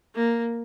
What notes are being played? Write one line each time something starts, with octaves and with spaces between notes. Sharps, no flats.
A#3